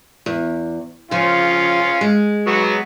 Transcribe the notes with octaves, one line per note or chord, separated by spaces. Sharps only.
E2
C#3 F3 C#4 F4
G#3
F#3 B3 F#4